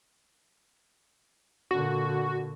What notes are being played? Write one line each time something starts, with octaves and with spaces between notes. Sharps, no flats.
A#2 D3 F#4